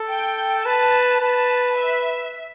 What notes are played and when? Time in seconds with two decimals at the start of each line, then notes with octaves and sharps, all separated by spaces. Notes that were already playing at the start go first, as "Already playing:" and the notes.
Already playing: A4
0.10 G5
0.65 B4 A5
1.21 B4 A5
1.77 E5